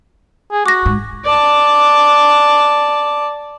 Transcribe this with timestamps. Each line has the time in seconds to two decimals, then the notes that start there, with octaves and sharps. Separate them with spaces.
0.52 G#4
0.66 F#4 D6 A#6
0.86 G#2
1.24 D5 A5